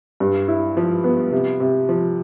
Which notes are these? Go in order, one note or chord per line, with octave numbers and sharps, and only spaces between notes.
G2
E4
F3
B3
C3
C3
F3